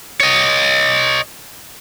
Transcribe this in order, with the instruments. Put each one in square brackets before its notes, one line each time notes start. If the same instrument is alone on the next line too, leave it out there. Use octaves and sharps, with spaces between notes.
[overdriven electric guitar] C#5 D#5